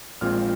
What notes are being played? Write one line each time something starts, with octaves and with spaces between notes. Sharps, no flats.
A#1 A#2 G#3 C4 F4 F6